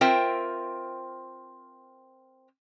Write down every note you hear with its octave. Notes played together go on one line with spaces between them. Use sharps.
C4 F4 A#4 C5 E5 G5